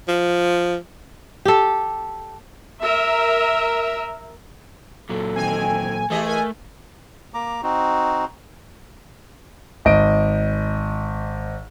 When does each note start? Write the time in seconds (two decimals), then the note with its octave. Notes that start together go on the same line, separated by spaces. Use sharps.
0.08 F3
1.45 G4 A4
2.82 A#4 E5
5.09 A#2 F#3 A4
5.36 D#3 C4 G#5
6.10 E3 A3 G4 G#4 D#5
6.26 A#4 G#5
7.34 A#3 A#5 D6
7.63 C4 D#4 F#4
9.85 G#1 D#5 D7